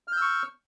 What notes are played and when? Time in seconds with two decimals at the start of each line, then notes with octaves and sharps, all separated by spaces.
0.08 F6
0.12 G6
0.17 E6
0.22 C#6